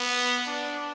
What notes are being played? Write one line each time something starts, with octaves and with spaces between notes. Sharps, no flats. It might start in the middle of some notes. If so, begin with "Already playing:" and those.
Already playing: B3
D4